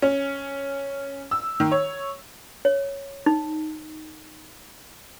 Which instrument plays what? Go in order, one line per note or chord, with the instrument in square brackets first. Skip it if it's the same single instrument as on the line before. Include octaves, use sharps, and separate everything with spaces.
[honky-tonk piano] C#4
E6
D#3
C#5
[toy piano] C#5
D#4